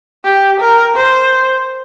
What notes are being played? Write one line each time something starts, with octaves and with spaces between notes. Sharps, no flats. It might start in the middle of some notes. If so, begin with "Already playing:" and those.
G4
A#4
C5